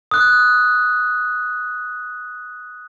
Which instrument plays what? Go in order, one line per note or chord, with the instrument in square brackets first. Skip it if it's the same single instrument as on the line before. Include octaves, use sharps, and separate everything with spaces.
[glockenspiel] D#6 F#6